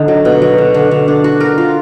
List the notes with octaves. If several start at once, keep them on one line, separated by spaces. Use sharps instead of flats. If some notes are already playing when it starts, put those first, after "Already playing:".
Already playing: D3 D#4
F#3
B2
F#3
D3
D3
D3
D4
F#4
A#4
F4